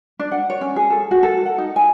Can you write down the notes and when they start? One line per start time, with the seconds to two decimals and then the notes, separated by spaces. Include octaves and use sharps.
0.19 D4
0.32 F#5
0.50 C#5
0.61 C#4
0.76 G#4
0.90 A4
1.11 F#4
1.23 A4
1.46 F#5
1.58 D#4
1.76 G#5